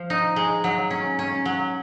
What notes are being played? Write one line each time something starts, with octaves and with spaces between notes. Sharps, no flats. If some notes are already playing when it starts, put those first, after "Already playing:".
Already playing: F3
D#4
G#3
F#3
C#4
C#4
F#3